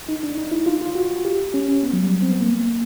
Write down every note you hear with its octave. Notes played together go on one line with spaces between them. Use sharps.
D#4
D4
D#4
E4
F4
F4
F#4
G4
C#4
C#4
B3
F#3
G3
C4
B3
A#3